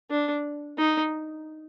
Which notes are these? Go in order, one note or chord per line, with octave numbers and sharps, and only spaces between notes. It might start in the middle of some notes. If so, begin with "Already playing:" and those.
D4
D#4